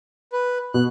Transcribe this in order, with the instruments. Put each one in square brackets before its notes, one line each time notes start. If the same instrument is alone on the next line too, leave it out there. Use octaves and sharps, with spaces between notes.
[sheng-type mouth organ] B4
[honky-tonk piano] B2 [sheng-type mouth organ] F#6